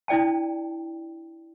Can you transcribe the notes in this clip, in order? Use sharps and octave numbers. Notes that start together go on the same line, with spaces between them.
D4 E4 D5 G5 A5